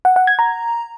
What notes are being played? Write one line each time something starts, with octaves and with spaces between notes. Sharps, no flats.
F#5
F#5
G#6
A#5